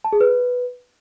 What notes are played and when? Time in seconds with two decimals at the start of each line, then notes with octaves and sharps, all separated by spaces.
0.04 A5
0.13 G#4
0.21 B4